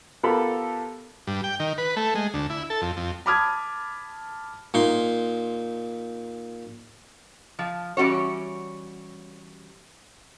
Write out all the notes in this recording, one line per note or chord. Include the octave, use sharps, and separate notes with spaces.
B3 F4 G4 A4 A#4 B5
G2
G5
D#3
B4
A3
G#3
D2
E4
A4
F2
F2
A5 B5 D6 D#6 F6 G#6
A#2 D#4 C6
F3
E3 G3 C#4 F#4 C#5